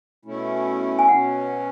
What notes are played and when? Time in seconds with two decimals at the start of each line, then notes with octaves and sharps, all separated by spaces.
0.25 B2 A3 C#4 E4
0.99 G#5
1.08 B2 F#3 C#4 F#5